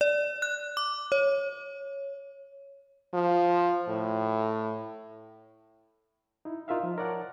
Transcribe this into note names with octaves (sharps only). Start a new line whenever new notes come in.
D5
F#6
D6
C#5
F3
A2
D#4 E4
D#4 F4 A#4 E5 F5
F3
A#4 C#5 D5 F#5 A5